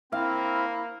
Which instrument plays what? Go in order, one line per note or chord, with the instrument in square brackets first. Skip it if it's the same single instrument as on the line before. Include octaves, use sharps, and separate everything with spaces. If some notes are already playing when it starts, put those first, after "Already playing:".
[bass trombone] A#3 [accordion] C4 [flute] E4 [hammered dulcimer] F5